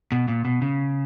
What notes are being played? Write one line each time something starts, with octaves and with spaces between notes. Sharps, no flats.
B2
A#2
B2
C#3